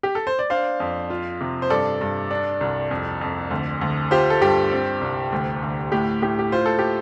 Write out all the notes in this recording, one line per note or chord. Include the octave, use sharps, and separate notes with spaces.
G4
A4
C5
D5
D4 C5 F5
F2
F4
C3
C5
G2 A4 D5
G2
D4
C2
F2
F2
D2
D2
F4 G4 C5
A4
G2 G4
C4
C2
D2
D2
A2 G4
A2 G4
G4
F4 C5
A4
G4